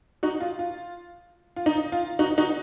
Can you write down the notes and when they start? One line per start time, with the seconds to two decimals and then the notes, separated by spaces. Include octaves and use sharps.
0.23 D#4 F#4
0.40 F4
0.59 F4
1.56 F4
1.66 D#4
1.92 F4
2.19 D#4 F#4
2.38 D#4 F#4